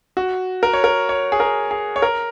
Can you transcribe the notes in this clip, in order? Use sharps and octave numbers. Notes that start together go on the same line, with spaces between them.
F#4
A#4
C#5
A#4
C#5
G#4
A#4
G#4
C#5
A#4